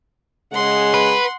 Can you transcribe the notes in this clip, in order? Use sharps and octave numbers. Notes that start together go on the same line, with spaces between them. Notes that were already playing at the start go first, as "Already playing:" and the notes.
C#3 G#3 F#5 C6
B4